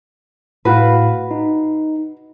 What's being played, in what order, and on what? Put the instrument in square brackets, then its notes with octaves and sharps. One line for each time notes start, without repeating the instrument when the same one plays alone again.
[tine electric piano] A2 F5 [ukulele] F#4 B4
[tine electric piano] D#4